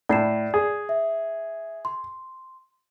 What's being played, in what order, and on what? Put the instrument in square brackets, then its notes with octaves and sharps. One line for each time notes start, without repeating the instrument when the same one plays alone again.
[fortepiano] A2 [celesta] D5 C7 E7
[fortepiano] G#4
[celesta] E5
C6